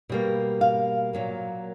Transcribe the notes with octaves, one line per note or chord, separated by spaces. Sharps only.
B2 G3 A#3
F5
A#2 F#3 A#3